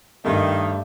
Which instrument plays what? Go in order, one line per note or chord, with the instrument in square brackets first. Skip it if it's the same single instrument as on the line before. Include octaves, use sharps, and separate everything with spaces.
[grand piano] G2 A3 [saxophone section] D#3